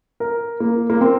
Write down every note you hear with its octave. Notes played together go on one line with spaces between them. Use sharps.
A#4
A#3
A#3
C4